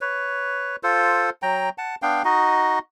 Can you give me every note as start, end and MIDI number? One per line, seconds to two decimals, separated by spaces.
0.01 0.76 71
0.01 0.76 73
0.83 1.30 65
0.83 1.30 69
0.83 1.30 72
1.42 1.69 54
1.42 1.69 79
1.42 1.69 82
1.78 1.95 78
1.78 1.95 81
2.02 2.23 59
2.02 2.23 62
2.02 2.23 77
2.02 2.23 79
2.25 2.79 63
2.25 2.79 66
2.25 2.79 75